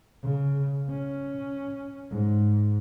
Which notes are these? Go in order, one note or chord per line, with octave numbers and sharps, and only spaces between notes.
C#3
C#4
G#2